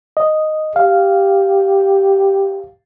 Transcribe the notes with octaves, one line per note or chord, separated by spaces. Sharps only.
D#5
G4 F5